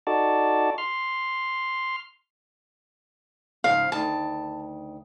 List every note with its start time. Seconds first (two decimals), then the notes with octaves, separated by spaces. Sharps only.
0.07 D#4 F#4 A4 D5 A5
0.78 C6 F6
3.64 G#2 C#3 F3 F5
3.92 D2 D#3 A5